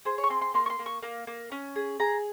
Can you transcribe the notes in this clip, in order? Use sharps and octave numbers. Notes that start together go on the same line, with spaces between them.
G#4 C5
C#5
C#6
C4 C6
C6
A#3 C6
C#6
C6
A#3
C#6
A#3
A#3
C#4
G#4
G#4 A#5